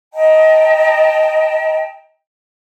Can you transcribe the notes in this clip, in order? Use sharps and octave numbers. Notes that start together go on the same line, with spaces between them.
D#5 G5 A5 A#5